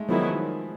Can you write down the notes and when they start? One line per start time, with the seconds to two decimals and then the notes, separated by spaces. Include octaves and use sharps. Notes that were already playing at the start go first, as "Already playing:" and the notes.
Already playing: G#3 A3 D#4
0.08 D#3 F3 F#3 B3 E4 G#4